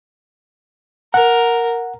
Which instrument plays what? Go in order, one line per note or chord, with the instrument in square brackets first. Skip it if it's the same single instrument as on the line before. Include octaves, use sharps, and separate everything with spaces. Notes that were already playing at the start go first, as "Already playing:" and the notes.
[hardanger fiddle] A#4 [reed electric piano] F#5